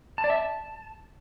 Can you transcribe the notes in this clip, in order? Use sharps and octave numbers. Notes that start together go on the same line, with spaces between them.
A5
D5
E5
A5